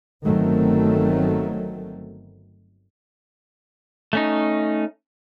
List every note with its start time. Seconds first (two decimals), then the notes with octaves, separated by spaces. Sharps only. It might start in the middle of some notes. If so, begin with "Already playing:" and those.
0.23 G1 D#3 F#3 A3 C4
4.13 A3 C#4 D#4